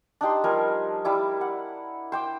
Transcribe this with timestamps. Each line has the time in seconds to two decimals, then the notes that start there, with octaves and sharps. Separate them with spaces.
0.21 D4 D#4 G4 C6
0.44 F3 G3 A#4 G#5
1.05 G3 E4 D5
1.41 F#5
2.12 C5 G5 D6